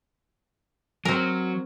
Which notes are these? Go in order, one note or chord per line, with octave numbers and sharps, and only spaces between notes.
F#3 C4 A#4